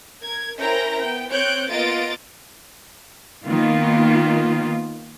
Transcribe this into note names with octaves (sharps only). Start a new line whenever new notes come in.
A#4 G#6
C#4 E4 A#4 C5 G5 A#5
B3 G5
C4 C#5 F#6 G6 D7
A#3 B3 F4 D#5 A6 D7
D#3 A#3 B3 F4